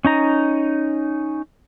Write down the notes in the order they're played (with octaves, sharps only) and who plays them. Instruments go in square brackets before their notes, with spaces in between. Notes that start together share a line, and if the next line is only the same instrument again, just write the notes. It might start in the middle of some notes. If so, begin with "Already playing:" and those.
[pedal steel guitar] C#4 D#4 A#5